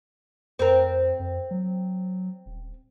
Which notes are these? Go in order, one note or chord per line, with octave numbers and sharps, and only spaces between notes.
F2 C4 A#4
F2
F#3
D#1